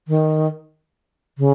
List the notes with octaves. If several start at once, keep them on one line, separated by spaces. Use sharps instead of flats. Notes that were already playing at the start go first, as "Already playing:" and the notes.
D#3
C#3